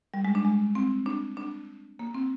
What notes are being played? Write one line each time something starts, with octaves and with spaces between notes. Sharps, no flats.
G3
G#3
D4
G#3
C4
D4
D4
A#3
C4